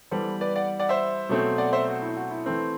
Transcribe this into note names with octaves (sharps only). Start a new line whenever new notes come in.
E3 G3 B3 A4 C5
B4 D5
D5 F#5
D5 F#5
C5 E5
B2 F#3 A3 C4
D5 F#5
C5 E5
F#4
E4
F#4
E4
E3 A3 C4